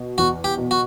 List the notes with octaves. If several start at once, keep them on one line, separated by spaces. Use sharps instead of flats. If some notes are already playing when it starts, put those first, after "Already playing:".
Already playing: B2
E2 F#4
G4
B2
F#4